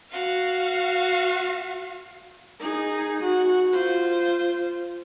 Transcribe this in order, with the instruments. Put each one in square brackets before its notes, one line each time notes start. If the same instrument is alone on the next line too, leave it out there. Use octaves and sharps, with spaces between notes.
[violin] F#4 F5
[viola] D#4 G#4
F#4
F4 C5